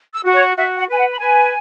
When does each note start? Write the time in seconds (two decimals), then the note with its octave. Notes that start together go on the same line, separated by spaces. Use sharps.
0.13 E6
0.24 F#4
0.35 C#5
0.56 F#4 E5
0.77 F#5
0.88 B4 G#5
0.99 F#5
1.12 B5
1.20 B4 G#5